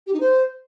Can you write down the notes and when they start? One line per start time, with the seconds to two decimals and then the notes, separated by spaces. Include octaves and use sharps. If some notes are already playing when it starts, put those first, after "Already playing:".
0.07 G4
0.13 D#4
0.20 C5